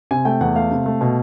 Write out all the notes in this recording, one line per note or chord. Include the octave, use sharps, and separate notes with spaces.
C3 G#5
A3 G5
E2 F#5
A3 F5
C3
A3
B2